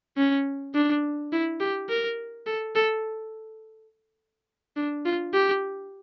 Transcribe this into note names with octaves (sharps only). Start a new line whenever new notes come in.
C#4
D4
E4
G4
A#4
A4
A4
D4
F4
G4